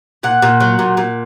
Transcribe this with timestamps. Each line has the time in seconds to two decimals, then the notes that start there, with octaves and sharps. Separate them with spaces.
0.23 A#2 F#5
0.42 A#2
0.60 F#3
0.79 A#2
0.97 A#2